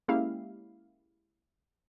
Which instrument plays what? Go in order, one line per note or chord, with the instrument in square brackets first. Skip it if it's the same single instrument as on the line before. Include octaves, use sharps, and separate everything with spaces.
[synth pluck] G#3 A#3 C#4 E4 G4 F5